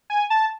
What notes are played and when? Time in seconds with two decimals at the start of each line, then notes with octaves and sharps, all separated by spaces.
0.10 G#5
0.30 A5